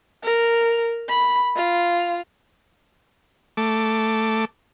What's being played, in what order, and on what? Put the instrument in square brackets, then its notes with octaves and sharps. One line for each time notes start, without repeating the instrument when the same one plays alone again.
[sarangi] A#4
B5
F4
[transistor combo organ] A3 D6